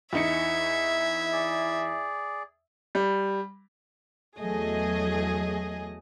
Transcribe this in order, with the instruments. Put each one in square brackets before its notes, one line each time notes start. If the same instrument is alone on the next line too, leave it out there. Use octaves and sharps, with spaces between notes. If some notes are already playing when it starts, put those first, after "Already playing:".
[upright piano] E2 D#4 C#7 [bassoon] E4 [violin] E5 G#6
[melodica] G#4 D5
[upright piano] G3
[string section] E2 F#3 A3 G#4 D#5